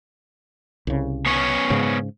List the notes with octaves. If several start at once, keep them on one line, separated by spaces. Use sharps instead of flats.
C2 C#3
B3 C#4 C#5
G#2 C#3